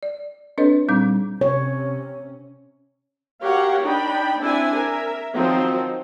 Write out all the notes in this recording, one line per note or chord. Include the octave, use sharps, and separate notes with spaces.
D5
C4 D4 A4 B4 C#5 D#5
A#2 G3 C4 D#4 D6
C3 C#4 C#5
F#4 G4 A#4 C#5 F5 F#5
D4 D#4 G5 B5
C4 D4 E4 E5 G#5
A#4 E5
D#3 F3 F#3 C4 D#4